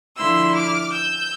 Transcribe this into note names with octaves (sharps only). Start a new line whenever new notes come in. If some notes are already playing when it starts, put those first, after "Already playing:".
D3 F3 A#3 E4 C6 E6
D6 F6
E6 G6